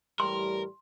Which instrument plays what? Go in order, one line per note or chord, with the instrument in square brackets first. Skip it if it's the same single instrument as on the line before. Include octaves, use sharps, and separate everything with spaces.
[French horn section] A2 E3 G3 [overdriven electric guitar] A#4 [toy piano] C6